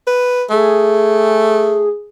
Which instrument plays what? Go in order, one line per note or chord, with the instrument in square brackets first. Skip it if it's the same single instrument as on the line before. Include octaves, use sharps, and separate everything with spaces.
[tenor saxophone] B4
[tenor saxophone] A3 [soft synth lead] G#4